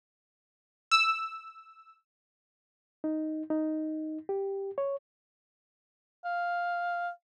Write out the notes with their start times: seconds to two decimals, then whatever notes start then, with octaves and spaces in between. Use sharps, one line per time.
0.91 E6
3.04 D#4
3.50 D#4
4.29 G4
4.78 C#5
6.24 F5